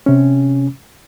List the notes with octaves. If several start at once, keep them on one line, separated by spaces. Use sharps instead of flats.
C3 C#4